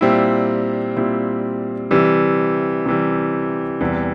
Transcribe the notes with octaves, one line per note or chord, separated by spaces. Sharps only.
A#2 G3 C4 E4
A#2 G3 C4 E4
C3 E3 G3
C3 E3 G3
E2 C3 E3 G3